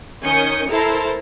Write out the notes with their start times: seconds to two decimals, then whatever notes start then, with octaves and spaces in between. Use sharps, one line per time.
0.23 D#3 C#4 G#5 D#6 G6 C#7
0.70 E4 A4 A#4 C5 A5